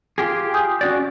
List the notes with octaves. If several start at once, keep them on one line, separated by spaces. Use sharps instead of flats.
F4 G4 G#4
G#5 D#6 G6
C#4 F#4 D5